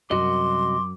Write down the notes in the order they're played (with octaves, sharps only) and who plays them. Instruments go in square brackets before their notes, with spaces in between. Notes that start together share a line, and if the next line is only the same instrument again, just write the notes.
[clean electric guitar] C2 F#4 D#5 [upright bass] F#2 [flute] C6 [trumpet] D6